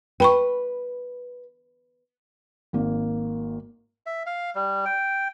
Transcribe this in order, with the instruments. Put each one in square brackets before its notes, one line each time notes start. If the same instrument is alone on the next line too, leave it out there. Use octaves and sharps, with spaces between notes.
[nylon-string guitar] B4 [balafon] G5 B5 C#6
[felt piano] G#1 A#3
[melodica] E5
F5
G3
G5